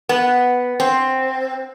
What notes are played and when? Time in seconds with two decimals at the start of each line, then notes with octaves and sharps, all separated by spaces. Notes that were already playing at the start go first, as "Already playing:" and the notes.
0.09 B3
0.80 C4